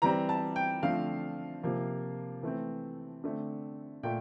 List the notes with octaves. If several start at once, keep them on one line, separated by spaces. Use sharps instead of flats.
E3 G3 C4 A#5
A5
G5
D3 F3 A3 C4 F5
C3 F3 A#3
E3 A3 C4
D3 A3 C4
A#2 A3 G5